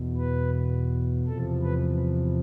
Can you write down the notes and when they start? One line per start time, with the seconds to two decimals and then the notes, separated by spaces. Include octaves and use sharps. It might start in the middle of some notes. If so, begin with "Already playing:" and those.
Already playing: E2 B2
0.17 B4
1.27 E2 C3 F3 A4
1.63 B4